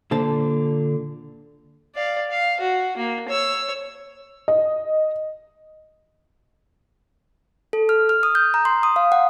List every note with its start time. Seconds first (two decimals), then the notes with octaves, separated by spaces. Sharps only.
0.11 A#2 D3 C5 A5
1.95 D5 F5
2.31 F5
2.60 F#4
2.97 A#3
3.29 C#5 E6
4.48 D#5
7.73 A4
7.89 F6
8.09 F6
8.23 D#6
8.35 G6
8.54 A#5
8.65 C6
8.83 D#6
8.96 F5
9.12 F#5